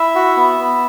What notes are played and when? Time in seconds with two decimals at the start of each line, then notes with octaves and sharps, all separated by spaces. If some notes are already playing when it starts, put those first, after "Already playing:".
Already playing: E4 E5
0.15 F#4
0.37 B3
0.60 B3